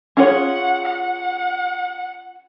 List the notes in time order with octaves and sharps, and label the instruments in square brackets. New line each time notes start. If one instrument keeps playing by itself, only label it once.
[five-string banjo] C#4 F4 G#4 C#5 [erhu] F#5
[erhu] F#5